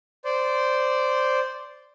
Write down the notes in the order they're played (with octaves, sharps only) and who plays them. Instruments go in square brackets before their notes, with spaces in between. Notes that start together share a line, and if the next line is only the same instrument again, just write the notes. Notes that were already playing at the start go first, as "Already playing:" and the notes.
[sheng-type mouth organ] C5 D5